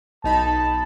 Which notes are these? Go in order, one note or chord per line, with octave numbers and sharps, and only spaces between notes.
B1 D#4 A5 B5